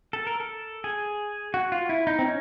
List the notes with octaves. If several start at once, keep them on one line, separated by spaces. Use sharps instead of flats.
A4
A#4
A4
G#4
F#4
F4
E4
D#4
C4
C#4